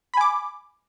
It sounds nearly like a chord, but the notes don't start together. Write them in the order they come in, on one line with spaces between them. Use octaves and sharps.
B5 G#5 D6